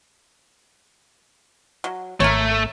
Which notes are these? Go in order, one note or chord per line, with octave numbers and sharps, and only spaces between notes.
F#3
G#1 A3 A#4 C#5